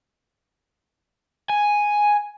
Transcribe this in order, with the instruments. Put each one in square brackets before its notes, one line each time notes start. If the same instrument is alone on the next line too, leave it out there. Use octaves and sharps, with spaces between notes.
[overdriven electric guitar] G#5